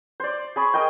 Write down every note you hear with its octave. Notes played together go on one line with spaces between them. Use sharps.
C5 D5
G#4 B5 C#6
G#4 A#4 D#5 G5